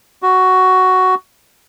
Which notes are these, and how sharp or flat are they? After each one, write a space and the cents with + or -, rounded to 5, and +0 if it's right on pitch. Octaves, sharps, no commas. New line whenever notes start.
F#4 +5